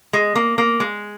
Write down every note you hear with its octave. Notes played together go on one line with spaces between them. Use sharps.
G#3
A#3
A#3
G#3